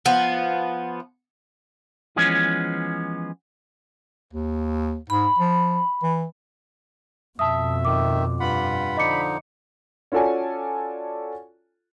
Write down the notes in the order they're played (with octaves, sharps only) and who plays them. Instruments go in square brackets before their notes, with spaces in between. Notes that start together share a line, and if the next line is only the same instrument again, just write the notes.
[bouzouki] F3 B3 [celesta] F#5
[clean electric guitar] E3 F3 G#3 B3 C#4
[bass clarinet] D#2
[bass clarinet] G#2 [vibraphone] B5
[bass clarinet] F3
E3
[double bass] F2 B2 [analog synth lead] E5 [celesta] A5 D#6
[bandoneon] D#3 [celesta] D6
[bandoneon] G2 F4 F#5 [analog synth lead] B5
[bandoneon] D3 F3 D#4 [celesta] D#5 D6 C#7
[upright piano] C#4 F4 F#4 A4 D5 G#5